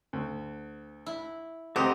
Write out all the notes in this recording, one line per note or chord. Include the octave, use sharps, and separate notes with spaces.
D2
E4
D2 C4 G4 A4 B4 D#5 F#5 A#5